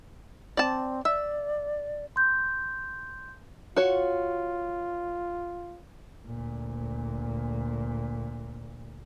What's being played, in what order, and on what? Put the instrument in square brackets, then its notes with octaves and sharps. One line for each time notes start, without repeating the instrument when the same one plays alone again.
[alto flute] C4 [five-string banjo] D5 A5
[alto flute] D5 [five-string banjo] E5
[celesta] C6 G6
[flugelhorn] F4 [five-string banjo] F#4 C#5
[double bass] D2 A#2